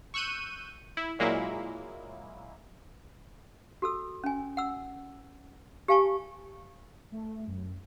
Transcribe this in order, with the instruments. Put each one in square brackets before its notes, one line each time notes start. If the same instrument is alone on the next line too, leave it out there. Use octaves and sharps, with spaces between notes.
[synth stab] C#6 E6 F#6 G6 D#7
E4
A#2 F#3 G#3 A#3 E4
[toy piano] F#4 A4 E6
C#4 G#5
F#5 E6
G4 F5 G#5 A5 C#6
[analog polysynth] A3
F#2